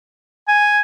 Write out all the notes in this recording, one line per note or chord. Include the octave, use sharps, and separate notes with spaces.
G#5